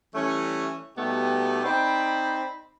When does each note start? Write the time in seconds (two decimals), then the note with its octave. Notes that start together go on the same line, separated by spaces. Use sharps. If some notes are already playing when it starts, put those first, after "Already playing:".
0.15 E3 G3 A3 C#4
0.97 B2 G3 A3 B3 D#4 G4
1.65 C4 D#4 C5 D5 B5